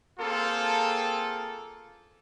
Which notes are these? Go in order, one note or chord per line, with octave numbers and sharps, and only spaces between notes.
A#3 C4 F4 G#4 A4